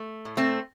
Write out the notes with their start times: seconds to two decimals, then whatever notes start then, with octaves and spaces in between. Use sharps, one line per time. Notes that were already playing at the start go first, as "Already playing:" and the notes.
Already playing: A3
0.25 A2
0.37 A3 C4